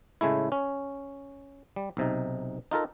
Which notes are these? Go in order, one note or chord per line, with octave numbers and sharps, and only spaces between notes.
A2 C#3 G#3 A3 E4
C#4
G3
B1 C3 D#4
D#4 F4 A4 A#4